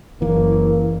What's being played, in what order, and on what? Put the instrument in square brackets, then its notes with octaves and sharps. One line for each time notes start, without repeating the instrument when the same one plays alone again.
[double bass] F#1 [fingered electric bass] E3 [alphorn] A#3